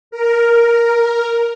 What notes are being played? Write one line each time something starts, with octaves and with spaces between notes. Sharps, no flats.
A#4